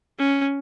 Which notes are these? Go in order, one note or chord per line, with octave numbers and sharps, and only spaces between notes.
C#4